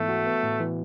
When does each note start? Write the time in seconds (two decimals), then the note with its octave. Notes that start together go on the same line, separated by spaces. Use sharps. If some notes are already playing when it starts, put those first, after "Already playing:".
Already playing: G#2 E3 A3 B3
0.09 F#4
0.26 B3
0.43 A2
0.60 E3